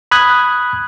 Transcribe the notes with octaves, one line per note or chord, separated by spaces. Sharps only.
B5 D#6 F#6 G#6